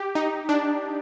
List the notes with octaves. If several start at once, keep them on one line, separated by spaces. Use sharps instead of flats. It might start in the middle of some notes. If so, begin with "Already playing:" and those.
Already playing: G4
D#4
D4